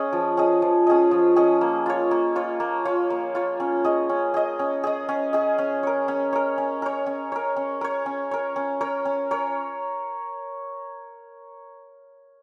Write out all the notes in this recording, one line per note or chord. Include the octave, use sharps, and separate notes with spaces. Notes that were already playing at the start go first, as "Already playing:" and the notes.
Already playing: C#4 G#4 D#5
F3
C#4 G#4 D#5
F3
C#4 G#4 D#5
F3
C#4 G#4 D#5
A#3
F4 C#5
A#3
F4 C#5
A#3
F4 C#5
A#3
F4 C#5
C#4
G#4 D#5
C#4
G#4 D#5
C#4
G#4 D#5
C#4
G#4 D#5
C#4
A#4 C#5
C#4
A#4 C#5
C#4
A#4 C#5
C#4
A#4 C#5
C#4
A#4 C#5
C#4
A#4 C#5
C#4
A#4 C#5
C#4
A#4 C#5